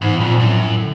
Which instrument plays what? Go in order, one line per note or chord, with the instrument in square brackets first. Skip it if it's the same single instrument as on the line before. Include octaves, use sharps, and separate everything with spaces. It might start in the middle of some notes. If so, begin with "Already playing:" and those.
[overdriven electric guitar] E2 [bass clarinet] G#2
[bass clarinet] A2
[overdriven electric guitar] F2 [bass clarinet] A#2
[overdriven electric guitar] F#2 [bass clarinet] A2
[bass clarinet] D3